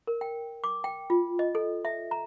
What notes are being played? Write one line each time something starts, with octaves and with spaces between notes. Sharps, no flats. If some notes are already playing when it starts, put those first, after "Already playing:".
A#4
G5
D6
G5
F4
D#5
A4
E5
A#5